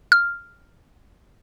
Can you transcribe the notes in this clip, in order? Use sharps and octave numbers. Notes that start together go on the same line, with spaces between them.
F6